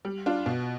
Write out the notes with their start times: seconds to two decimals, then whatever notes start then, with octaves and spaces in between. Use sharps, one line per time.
0.05 G3
0.26 D4 F4
0.46 B2